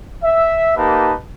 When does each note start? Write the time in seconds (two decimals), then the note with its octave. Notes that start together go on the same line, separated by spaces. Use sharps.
0.24 E5
0.77 A#3 D#4 G4 B4 A5